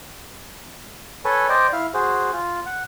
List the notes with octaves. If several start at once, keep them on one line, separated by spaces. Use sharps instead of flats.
A4 B4 C#5 G#5
C5 D5 D#5 G5
E4 F5
F#4 G#4 C5
F4
F#5